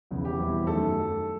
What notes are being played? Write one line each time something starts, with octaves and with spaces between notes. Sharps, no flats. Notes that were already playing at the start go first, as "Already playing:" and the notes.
E1 E2 C#3 E3
G4
E2 B2 G3 C4 E4
F#2 D#3 F#3 A3 A4